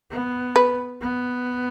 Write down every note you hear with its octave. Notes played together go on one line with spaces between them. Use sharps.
B3
B4
B3